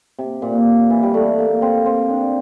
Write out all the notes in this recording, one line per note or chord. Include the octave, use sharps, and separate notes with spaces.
C3
A#2
E3
G3
A3
A#3
C4
C4
D4